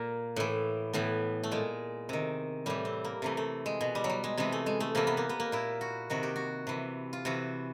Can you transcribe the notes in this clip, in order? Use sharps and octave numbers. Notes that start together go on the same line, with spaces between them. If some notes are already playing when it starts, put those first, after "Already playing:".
Already playing: A#2 A#3
A2 E3
A2 E3 B3
A3
A#2 G#3
C3 D#3
A2 E3 G3
C4
A#3
C3 E3 A3
A3
G#3
B2
G3
F#3
G3
G#3
C3 E3 G#3
A3
G#3
A3
C3 E3 A#3
B3
A#3
B3
A#3
A#2 E4
F#4
C3 D#3 F#4
G4
F#4
C3 E3
F4
C3 E3 F#4